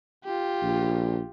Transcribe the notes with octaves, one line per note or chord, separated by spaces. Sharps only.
F4 G4
A#1